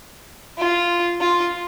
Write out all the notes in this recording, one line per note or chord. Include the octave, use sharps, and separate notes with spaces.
F4
F4